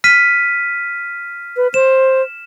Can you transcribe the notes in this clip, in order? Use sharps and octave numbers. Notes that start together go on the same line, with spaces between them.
F6 B6 D#7
B4
C5 E7